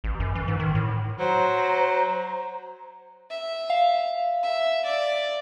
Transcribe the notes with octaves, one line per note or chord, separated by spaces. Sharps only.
A1
F#2
E3
G#2
D#3
A2
F#3 C5 A#5
E5
F5
E5
D5